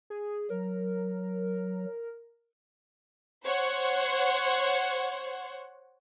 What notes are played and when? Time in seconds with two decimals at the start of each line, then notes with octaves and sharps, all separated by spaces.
0.10 G#4
0.50 F#3 A#4
3.44 C5 C#5 F#5